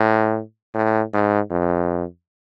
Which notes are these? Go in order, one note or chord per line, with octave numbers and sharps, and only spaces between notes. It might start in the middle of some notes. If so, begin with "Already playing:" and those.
Already playing: A2
A2
G#2
F2